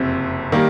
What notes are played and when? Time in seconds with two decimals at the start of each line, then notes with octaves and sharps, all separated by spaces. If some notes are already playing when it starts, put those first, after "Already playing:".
Already playing: F#1 F2 C3
0.52 D#3 G3 A#3